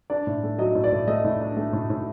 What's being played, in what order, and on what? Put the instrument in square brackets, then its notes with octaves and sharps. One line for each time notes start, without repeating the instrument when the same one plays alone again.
[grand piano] D4 D5
A2
A3
F#3 D#5
A2
D5
A2
A3 D#5
A2
D4
A3
A2
A2